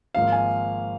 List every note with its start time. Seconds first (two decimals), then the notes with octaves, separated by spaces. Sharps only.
0.15 G#1 G#2 F3 A#3 F5
0.32 G#5